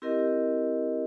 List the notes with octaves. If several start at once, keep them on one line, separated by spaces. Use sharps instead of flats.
C4 E4 G4 A#4 D#5